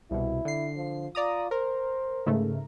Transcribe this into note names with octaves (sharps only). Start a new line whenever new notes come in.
C2 B2 E4
D3 C7
F3
F4 D5 A#5 D#6
A#4 C5
G#2 C#3 A3